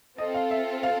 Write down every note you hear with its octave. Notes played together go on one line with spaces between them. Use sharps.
C4 F4 A4 D#5
F5
E5
F5